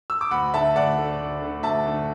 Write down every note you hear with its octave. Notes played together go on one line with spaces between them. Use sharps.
E6
D6
D2 F#5 B5
D3 A3 E5 A5
D2 D5 F#5
D3 A3
D2
D3 A3
D2 E5 A5
D3 A3